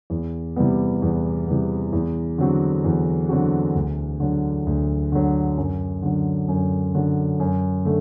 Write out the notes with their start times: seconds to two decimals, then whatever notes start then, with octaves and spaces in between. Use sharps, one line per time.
0.10 E2
0.56 C3 E3 G3 B3
1.02 E2
1.47 C3 E3 G3 B3
1.93 E2
2.38 D3 F#3 C4 F#4
2.84 E2
3.29 D3 F#3 C4 F#4
3.75 D2
4.20 D3 F#3
4.66 D2
5.12 D3 F#3
5.57 F#2
6.02 D3 F#3
6.48 F#2
6.94 D3 F#3
7.40 F#2
7.85 D3 A3